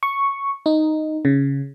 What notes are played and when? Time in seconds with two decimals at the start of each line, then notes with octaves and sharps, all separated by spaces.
0.03 C#6
0.66 D#4
1.25 C#3